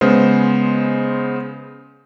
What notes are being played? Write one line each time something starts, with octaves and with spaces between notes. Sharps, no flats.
C#3 G#3 B3 C5